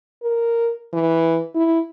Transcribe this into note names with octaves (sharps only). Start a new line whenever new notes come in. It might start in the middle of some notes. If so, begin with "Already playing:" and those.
A#4
E3
E4